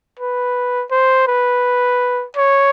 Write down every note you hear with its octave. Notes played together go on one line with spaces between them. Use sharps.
B4
C5
B4
C#5